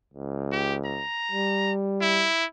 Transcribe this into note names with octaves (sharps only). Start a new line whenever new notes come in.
C#2
G4
A#5
G3
E4